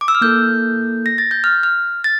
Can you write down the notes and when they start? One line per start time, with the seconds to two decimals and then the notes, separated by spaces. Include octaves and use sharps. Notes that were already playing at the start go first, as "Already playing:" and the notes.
0.01 D6
0.08 E6
0.15 F6
0.21 A#3 E4 A4 G6
1.06 A#6
1.18 A6
1.31 G6
1.44 F6
1.63 F6
2.04 A6